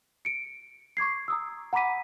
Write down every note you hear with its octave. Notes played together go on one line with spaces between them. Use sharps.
C#7 D7
C#6 D6 G#6 C7
A#5 D#6 E6
F#5 A#5 B5 D6 B6 D#7